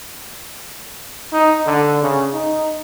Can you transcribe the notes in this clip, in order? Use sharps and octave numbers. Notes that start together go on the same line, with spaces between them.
D#4
D3
C#3
D#4